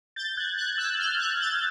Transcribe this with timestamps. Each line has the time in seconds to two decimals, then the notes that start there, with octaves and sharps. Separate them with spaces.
0.16 G6 A6
0.37 F#6 G#6
0.58 F#6 G#6
0.78 E6 F#6
0.99 F6 G6
1.19 F#6 G#6
1.40 G6 A6